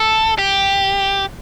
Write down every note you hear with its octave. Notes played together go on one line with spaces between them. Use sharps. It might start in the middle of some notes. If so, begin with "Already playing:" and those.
Already playing: A4
G4